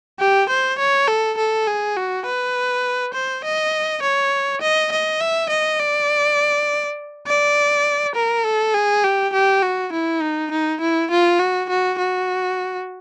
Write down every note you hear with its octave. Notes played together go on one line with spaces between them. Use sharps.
G4
C5
C#5
A4
A4
G#4
F#4
B4
C5
D#5
C#5
D#5
D#5
E5
D#5
D5
D5
A#4
A4
G#4
G4
G4
F#4
E4
D#4
D#4
E4
F4
F#4
F#4
F#4